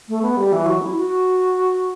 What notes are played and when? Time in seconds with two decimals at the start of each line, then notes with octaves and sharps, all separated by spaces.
0.09 A3
0.22 B3
0.37 G3
0.52 E3
0.66 F#3
0.82 E4
0.96 F#4